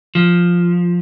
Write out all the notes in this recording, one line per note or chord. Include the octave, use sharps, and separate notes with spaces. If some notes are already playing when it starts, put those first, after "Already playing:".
F3